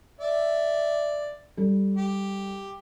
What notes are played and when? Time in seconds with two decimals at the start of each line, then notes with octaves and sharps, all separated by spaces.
0.21 D5 E5
1.57 G3 A4
1.97 G4